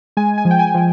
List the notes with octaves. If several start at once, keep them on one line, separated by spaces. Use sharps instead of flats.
G#3 G#5
G#5
F3
G5
G#5
F3